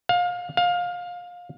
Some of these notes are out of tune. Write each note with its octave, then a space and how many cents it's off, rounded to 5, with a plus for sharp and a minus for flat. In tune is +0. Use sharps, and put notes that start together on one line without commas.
F5 +25
F5 +20